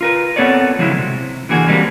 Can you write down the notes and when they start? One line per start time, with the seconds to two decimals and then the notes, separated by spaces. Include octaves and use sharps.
0.01 F4 A#4 B4
0.36 B3 C4 A4 C#5 D5
0.79 C#3 F3 F#3 G#3 E4
0.99 C3
1.49 D3 E3 A#3 F#4 G#4
1.67 D3 E3 G3 G#3 A#3 C4